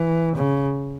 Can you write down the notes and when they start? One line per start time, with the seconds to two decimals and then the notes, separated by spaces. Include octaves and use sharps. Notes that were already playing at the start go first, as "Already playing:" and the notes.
Already playing: E3
0.36 C#3